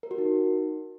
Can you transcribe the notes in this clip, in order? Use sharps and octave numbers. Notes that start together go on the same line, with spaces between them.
A#4
F#4
D#4